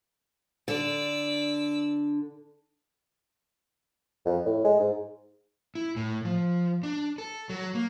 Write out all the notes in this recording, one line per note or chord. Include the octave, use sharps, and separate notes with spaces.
D3 D5 E6
F2
A2
G#3
G#2
E4
A2
F3
D4
A4
F#3
A#3